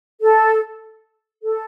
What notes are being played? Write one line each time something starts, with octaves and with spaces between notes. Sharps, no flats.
A4
A4